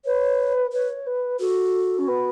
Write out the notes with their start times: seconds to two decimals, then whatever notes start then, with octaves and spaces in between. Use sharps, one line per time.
0.05 B4 C#5
0.73 B4 C#5
1.06 B4
1.40 F#4 A4
1.98 C#4
2.07 B3